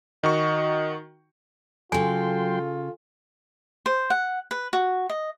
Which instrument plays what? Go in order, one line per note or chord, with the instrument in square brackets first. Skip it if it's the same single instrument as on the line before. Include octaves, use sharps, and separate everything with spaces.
[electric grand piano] D#3 F#4 C#6 [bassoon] D#4
[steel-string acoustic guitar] C#3 A4 [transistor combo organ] F#3 G5 C6 [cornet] F4 [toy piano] G#5
[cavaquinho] C5
F#5
B4
F#4
D#5